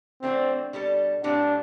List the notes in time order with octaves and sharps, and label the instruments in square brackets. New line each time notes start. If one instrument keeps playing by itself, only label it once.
[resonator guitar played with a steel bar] E3 A3 D4 F#4 [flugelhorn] C4
[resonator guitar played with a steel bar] B2 G3 D4 A4
[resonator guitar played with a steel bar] A2 F#3 C4 G4 [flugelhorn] D4